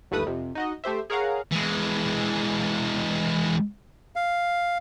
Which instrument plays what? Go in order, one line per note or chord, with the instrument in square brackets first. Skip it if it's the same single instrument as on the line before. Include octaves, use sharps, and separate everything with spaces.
[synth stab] G1 D#2 A3 B4 D#6
F2 C3
D#4 F#4 D#5
A3 G4 C5 E5
G#4 A#4 C#5 F5 F#5 A#5
[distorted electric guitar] E3 G#3
[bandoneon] F5